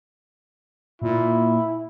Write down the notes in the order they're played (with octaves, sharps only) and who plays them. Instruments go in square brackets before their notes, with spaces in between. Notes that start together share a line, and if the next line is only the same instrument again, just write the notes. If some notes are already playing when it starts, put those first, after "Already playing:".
[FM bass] A#2 [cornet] E4